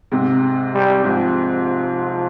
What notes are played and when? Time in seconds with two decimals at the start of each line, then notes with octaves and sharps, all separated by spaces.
0.12 G#2 C3
0.74 G3
1.04 G#2 F3